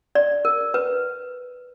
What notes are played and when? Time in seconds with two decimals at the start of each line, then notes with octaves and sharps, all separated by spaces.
0.15 D5
0.45 A#4
0.74 B4